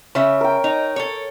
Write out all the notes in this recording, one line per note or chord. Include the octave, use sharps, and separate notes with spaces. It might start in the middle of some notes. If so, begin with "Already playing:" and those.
C#3 C#5 E5
A#4 G5
D#4
A4 C#5